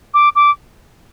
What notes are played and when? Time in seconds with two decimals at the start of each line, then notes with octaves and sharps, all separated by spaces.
0.14 D6
0.35 D6